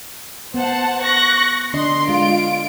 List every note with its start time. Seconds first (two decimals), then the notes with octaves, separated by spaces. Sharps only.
0.54 B3 C5 F#5 A5
1.01 C#6 F#6 A#6
1.73 D3 D4 D#5 C6
2.09 G#3 F4 D7